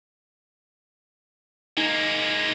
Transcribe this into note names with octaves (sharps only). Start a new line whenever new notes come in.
G#3 A#3 D#4